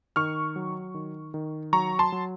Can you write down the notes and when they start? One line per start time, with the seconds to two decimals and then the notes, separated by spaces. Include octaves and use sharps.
0.16 D#3 C#6 F6
0.56 F#3
0.94 D#3
1.34 D#3
1.73 F#3 A#5 C#6
1.99 A5 C6
2.12 F#3